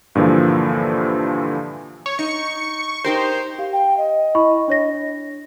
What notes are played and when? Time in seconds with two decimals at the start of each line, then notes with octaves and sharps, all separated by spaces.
0.15 G2 A#2 D3 E3 F3
2.06 C#5
2.19 D#4 C#6
3.04 D#4 G4 A#4 C5
3.58 G4 F5
3.73 G5
3.98 D#5
4.35 E4 B5 C#6
4.68 D4 C#5 A#6